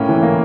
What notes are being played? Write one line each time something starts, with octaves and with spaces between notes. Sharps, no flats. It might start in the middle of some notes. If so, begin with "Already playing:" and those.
Already playing: A2 A#3 C#4 G5
E3
A#3